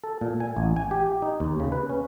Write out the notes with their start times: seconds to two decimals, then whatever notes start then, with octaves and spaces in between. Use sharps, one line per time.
0.04 A4
0.21 A#2
0.40 G#5
0.57 A1
0.76 G#5
0.91 G4
1.22 D#4
1.40 D#2
1.60 C#3
1.72 B4
1.90 C#4